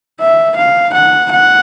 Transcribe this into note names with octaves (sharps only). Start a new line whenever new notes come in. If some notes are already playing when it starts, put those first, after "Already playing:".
E5
F5
F#5
F#5